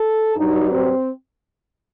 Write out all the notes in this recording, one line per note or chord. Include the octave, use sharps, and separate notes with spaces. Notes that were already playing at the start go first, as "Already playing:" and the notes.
Already playing: A4
G2 F#3 D#4
C4